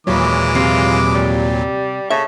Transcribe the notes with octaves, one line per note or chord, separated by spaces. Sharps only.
D#2 A#2 C#3 E3 F#3 G#3 D6
C3 F4
G3
C#3 A4 E5